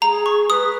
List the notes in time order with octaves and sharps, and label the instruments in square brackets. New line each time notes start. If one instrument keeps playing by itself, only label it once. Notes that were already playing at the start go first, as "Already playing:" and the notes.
[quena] G#4 [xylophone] A#5
[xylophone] C#6
[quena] B4 [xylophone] D#6